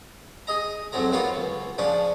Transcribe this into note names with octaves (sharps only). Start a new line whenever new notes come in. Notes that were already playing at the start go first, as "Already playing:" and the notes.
G#4 D#5 A#5
F2 G#2 F#3 G#3 A#5
F#3 A#3 B3 F4 F#4 C#5
C#2
C#3 F3 C#4 D4